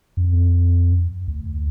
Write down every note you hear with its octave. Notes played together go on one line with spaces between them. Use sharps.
F2
D2